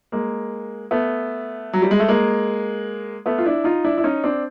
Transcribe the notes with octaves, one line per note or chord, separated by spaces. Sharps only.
G#3 A#3
A3 B3
F#3
G3
G#3
A3
G#3 A#3
A3 B3
F4
D4 E4
D#4 F4
D4 E4
E4
C#4 D#4
C4 D4